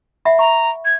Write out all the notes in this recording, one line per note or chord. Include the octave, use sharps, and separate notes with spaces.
E5 F#5 B5
A#5 C#6
G#6